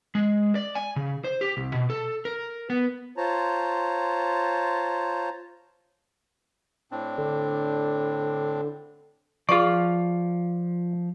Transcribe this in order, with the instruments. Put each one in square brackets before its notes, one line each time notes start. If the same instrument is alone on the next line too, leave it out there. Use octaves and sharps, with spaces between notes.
[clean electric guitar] G#3
D5
G#5
C#3
C5
G4
C2
B2
A4
A#4
B3
[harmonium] F4 C5 C#5 A5 A#5
[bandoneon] A2 C4 D4
[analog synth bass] D3
[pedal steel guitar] F3 F6 [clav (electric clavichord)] F4 D5 [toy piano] G#4 B4 C#6